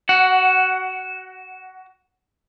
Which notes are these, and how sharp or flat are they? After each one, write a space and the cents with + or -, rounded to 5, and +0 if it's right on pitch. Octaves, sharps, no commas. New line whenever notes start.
F#4 +20 F#5 +0